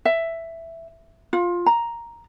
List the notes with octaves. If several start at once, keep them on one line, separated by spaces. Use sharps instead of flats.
E5
F4
A#5